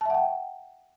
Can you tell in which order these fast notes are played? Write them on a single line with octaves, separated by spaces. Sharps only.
A5 E5 F#5 G5